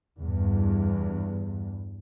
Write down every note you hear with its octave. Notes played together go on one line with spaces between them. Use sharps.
E2 G2